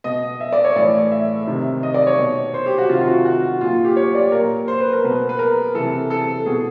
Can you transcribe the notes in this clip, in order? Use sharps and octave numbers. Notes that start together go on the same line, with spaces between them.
B2 D#5
E5
D5
C#5
A2 E3 D5
E5
C3 D#3
D#5
D5
C#5
B2
C5
G4
F#4
C3 D#3 F4
F4
F#4
F#4
A#2 F4
G4
C#5
D5
A#2 A#4
C5
B4
A#4
B2 B4
B4
A#4
C3 E3 A4
A4
B2 G#4